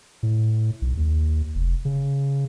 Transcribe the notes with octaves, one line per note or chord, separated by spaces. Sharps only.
A2
B1
D#2
F1
C#3